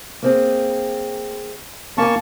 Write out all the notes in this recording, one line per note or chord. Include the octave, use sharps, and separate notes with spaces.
A#3 C4 G#4
A#3 C#4 G#5 A5 C#6